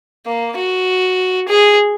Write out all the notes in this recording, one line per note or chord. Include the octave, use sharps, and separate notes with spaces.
A#3
F#4
G#4